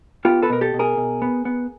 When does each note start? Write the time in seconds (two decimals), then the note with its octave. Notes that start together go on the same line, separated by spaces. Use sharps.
0.25 B3 F4 G4
0.42 A4 B4
0.49 B2 A#4
0.61 G4 A4
0.74 B2
0.79 G#4 A#4
0.97 B2
1.22 B3
1.45 B3